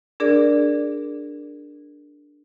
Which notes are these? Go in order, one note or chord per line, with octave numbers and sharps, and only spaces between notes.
D4 G#4 A#4 D5